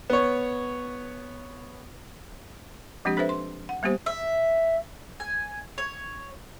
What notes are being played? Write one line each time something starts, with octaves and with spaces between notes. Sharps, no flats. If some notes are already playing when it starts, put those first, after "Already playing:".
B3 C#5
F3 G#3 C4 D4 G4
D4 A4 B4 C5 E5
C6
F#5
G3 A#3 B3 G4 C5
E5
G#5
C#5